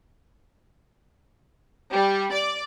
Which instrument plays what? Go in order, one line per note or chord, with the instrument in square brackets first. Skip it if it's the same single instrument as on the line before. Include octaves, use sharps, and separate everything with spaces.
[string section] G3
D5